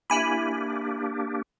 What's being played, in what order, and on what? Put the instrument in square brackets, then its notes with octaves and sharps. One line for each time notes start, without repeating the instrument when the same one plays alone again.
[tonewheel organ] A#3 D4 G4 [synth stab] E4 G#5 B5